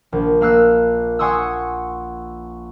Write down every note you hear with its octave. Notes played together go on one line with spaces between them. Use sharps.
A#1
A#3 F5 E6 F#6
F#5 G#5 C6 C#6 D#6 E6